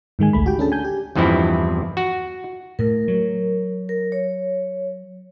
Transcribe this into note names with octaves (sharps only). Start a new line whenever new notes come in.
G#2 D#3 G#3 G#5
A1 D2 A3 B5
F#4 G4 G5
C#4 D4 G#4 A4 A5
G#5 G6
G4
E2 G2 E3 F3 C4 E4
F#4
A2 A#4
F#3
A#4
C#5